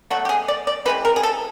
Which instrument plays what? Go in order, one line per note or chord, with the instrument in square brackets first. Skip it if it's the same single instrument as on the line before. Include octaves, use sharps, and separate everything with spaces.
[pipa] B2 F#3 A3 F#4
G4
G#4
D5
D5
E3 G#3 C4 B4
A#4
G#4
A4